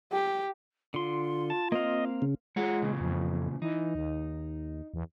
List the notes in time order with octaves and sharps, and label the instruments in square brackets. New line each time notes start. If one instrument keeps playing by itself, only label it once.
[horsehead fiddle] G4
[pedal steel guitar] D3 C6 [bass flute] F4
[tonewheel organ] A5
[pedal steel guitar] A#3 C4 F5 [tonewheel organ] D#5
[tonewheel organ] C#3
[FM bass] G#3 [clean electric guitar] F4 C#5 F#5
[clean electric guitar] E2 A#2 C#3
[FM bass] F2
[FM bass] E3 [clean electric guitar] D#4
[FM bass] D#2
E2